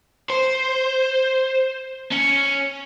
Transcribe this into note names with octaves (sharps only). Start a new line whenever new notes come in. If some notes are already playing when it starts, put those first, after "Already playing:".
C5
C#4